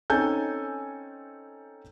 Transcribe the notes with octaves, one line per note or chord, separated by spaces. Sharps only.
C4 C#4 D#4 A4 G#5 G6